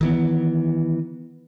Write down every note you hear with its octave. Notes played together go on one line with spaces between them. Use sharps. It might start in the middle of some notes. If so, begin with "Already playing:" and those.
D#3 E3 B3